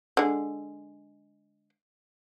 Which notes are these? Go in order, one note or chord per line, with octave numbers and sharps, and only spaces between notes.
D3 G#3